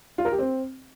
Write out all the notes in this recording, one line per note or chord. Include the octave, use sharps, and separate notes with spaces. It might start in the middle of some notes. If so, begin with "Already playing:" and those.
F4
A#4
G4
C4